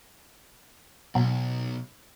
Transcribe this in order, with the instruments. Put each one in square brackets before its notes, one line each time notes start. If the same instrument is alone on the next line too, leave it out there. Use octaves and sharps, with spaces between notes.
[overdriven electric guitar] B1 [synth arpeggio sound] B2 F#3